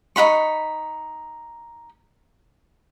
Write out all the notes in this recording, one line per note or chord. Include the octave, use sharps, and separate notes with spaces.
D#4 F4 B5 C#6